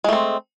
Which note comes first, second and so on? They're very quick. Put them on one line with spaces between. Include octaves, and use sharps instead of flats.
G#3 A3 C4